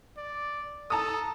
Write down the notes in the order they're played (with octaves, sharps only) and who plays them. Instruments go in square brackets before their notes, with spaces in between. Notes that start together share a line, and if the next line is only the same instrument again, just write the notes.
[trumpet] D5
[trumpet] A4 [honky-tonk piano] A5 A#5 D#6